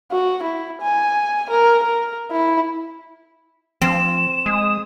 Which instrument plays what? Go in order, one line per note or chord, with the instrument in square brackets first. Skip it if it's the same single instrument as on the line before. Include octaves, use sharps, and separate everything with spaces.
[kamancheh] F#4
E4
G#5
A#4
A#4
E4
[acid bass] F3 [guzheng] C4 [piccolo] E7
[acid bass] G#3 [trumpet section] D#6